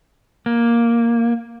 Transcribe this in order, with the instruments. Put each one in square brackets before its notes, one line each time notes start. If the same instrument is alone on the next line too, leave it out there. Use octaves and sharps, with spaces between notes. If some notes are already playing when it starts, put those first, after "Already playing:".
[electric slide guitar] A#3